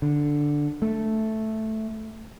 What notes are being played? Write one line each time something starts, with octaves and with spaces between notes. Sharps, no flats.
D3
A3